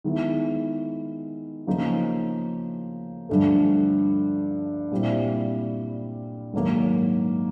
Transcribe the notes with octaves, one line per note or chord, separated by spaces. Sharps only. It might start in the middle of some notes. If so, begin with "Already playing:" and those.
D#3 G#3 B3 E4
C#3 F3 A#3 D#4
G2 D3 F3 A3
A#2 G3 C4 E4
G#2 D#3 F#3 A#3